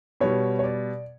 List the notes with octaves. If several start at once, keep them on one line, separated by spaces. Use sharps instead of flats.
B2 G3 C#5
C#5
D5